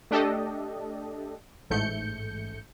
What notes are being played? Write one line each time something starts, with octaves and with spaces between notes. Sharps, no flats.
A3 D4 G4 A4 D#5
A1 G#2 A3 G6 C#7